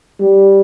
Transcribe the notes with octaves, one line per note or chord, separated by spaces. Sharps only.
G3